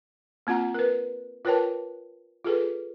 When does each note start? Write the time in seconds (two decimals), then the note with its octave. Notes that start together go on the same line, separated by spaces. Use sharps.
0.47 A#3 C4 F4 F#5 A#5
0.74 A#4 B4
1.45 F4 A#4 B4 C#5 G5 A5
2.45 F4 G#4 A4 B4